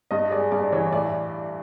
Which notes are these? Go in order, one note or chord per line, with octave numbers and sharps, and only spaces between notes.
G2 D#5
G#3 D5
G2 D5
D5
E3 C#5
A2 D5